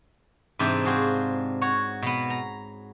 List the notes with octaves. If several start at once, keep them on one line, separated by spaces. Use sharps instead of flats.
G#2 C3 E3 C4 D4
C4 F4 F#4 G#4
F#4 C#5
B2 B3
A#5